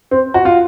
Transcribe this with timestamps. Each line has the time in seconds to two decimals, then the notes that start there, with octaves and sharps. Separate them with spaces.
0.11 C4
0.34 F#4
0.45 F4